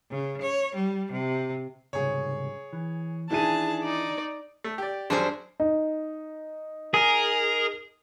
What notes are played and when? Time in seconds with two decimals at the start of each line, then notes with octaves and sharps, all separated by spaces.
0.10 C#3
0.41 C#5
0.75 G3
1.12 C3
1.93 C2 G#2 C#3 G#4 C#5
2.73 E3
3.30 D#3 E3 D4 E4 G#4 A5 D#7
3.83 D#4 D5
4.64 A3
4.78 G4 D5
5.10 F#2 G3 D4 G#4 C5
5.60 D#4
6.94 G#4 A#4